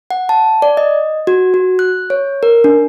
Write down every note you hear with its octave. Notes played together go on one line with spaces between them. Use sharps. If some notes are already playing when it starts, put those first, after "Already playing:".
F#5
A5
D5
D#5
F#4
F#4
F#6
C#5
A#4
D4